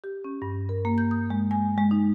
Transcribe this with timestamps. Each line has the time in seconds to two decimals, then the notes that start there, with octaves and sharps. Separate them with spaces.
0.04 G4
0.24 C#4
0.42 G2
0.69 A#4
0.85 A#3
0.98 G6
1.11 D#6
1.30 G#3
1.51 G#5
1.78 G#3
1.91 D#4